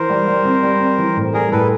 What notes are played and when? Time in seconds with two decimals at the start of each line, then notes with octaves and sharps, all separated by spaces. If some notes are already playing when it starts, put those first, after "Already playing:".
Already playing: E3 A#4 C5
0.10 G3
0.28 G3
0.45 C4
0.63 G3
0.80 C4
0.98 E3
1.17 A2
1.34 G3 G#4 A#4
1.51 A2 A4 B4